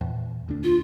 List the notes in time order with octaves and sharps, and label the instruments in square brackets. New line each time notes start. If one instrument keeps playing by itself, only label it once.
[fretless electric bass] E2 A#2
D2 D4
[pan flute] F4